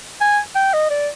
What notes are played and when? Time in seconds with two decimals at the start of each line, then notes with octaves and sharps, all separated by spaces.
0.21 G#5
0.55 G5
0.73 D#5
0.90 D5